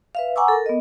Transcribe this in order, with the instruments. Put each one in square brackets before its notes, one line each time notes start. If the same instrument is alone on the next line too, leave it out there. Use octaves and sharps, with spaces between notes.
[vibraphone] B4 E5 F5
F#5 G#5 A#5 C#6 D6 E6
A4 A#4
B3 D#5